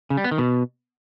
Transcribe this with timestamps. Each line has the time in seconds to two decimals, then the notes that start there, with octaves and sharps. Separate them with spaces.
0.10 C#3
0.17 G3
0.24 B3
0.31 D#3
0.38 B2